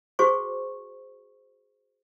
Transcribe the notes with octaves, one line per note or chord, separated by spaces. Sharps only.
F#4 G#4 C5 C#6